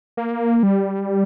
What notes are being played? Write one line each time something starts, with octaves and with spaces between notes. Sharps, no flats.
A#3
G3